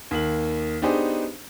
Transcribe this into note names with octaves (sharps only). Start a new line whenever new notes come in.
D#2 A#3 F#7
B3 D4 D#4 G4 G#4 C5